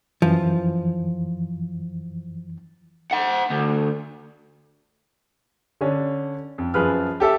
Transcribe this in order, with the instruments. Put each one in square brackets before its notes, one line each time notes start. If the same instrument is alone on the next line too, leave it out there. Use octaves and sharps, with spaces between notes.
[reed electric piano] F#2 E3 [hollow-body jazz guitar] F3
[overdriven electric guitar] C5 F#5
D2
[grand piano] D3 C#4 D4
F2
F#2 F3 G#4 B4 F6
G4 A4 E5